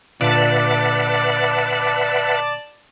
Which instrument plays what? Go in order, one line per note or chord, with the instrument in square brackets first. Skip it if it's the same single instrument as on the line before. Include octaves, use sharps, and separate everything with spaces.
[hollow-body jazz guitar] A#2 D3 F4 [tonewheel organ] B4 E5 F#5 [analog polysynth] D5 A5